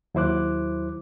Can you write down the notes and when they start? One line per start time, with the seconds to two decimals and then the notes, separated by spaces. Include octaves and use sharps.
0.15 D#2 F#3 E4 C5 D6 F#6